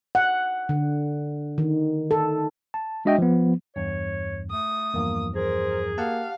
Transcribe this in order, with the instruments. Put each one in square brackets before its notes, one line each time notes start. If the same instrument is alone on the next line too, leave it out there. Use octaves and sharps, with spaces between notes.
[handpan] F#5
D3
D#3
A4
[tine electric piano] A5
G#3 D4 F#4 D#5 E5 G5
F3 B3
[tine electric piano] E2 G2 [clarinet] C#5
[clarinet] A3 [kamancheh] D#6
[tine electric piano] E2 G2 F3 [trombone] A#3
[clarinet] G#4 [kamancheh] A#4 [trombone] C5
[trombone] A#3 [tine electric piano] G4 F#5 A5 [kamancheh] F5